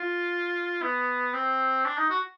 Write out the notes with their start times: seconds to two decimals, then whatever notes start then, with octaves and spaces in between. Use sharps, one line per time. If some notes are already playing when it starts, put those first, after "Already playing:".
Already playing: F4
0.82 B3
1.34 C4
1.85 D4
1.97 D#4
2.10 F#4